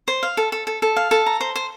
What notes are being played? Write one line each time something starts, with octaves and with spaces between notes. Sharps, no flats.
C5
F5
A4
A4
A4
A4
F5
A4
A#5
C5
C5